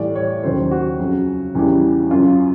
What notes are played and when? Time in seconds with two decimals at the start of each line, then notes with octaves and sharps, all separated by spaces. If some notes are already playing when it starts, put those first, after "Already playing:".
Already playing: A2 E3 G3 D5
0.16 C#5
0.43 D#2 C#3 F#3 C5
0.71 F#4
0.99 F2 C#3 F#3
1.55 E2 C#3 E3 G3
2.11 F#2 C#3 F#3 F4